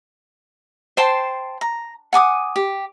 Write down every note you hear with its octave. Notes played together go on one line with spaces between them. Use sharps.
C5 G5 A5 C6
A#5
F#5 G#5 D6 D#6
G4